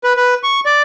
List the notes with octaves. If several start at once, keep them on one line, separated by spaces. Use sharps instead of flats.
B4
B4
C#6
D5